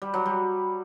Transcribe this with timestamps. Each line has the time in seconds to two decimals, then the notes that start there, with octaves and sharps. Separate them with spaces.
0.02 G3
0.14 F#3
0.26 G3